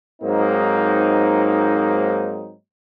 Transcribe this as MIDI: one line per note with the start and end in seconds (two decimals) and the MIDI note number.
0.22 2.53 44
0.22 2.53 54
0.22 2.53 58
0.22 2.53 60
0.22 2.53 63